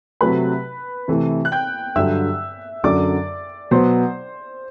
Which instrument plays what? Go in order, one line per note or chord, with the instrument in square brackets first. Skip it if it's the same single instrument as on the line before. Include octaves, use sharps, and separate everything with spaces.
[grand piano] C3 F#3 A3 [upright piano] B4 B5
[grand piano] C3 E3 A3
[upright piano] F#6
G5 G6
[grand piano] G2 D3 F#3 [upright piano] E5 E6
[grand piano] F#2 D3 F#3 [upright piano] D5 D6
[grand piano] B2 F#3 B3 [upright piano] C5 C6